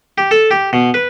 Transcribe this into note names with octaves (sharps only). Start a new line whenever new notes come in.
G4
A4
G4
B2
B4